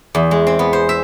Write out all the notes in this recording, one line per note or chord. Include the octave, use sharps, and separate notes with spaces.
E2
G#3
C4
B3
C5
E5